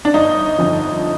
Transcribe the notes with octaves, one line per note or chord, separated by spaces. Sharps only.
D4
G1 D#4
F2 D3 F3